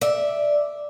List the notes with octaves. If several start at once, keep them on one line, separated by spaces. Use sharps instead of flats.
D5 E5